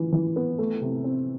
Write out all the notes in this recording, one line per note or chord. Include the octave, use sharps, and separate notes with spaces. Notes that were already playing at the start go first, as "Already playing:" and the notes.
Already playing: E3 F4
E3
B3
A3
C3
C4